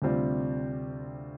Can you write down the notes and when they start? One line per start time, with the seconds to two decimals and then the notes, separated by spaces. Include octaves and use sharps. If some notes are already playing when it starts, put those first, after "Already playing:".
0.02 D2 C3 G3 C4 F4